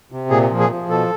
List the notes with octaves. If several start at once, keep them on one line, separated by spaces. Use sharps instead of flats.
C3
A#2 G#4
F3
G#4
F3
B2 A4